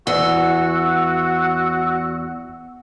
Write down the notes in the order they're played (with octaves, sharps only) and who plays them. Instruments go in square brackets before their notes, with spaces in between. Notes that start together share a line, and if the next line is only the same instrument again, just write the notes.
[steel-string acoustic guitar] E2 [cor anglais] F#4 [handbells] F#5 [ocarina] E6